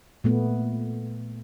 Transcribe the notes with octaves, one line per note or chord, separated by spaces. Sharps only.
A#2 A3 B3